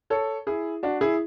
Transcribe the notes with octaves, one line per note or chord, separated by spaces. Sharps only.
A4 C#5
E4 G#4
D4 F#4
E4 G#4